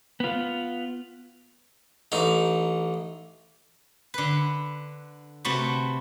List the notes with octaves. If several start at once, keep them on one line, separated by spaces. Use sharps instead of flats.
B3 F4
A1 D#4
D3 B4
C3 A3 F#4 B4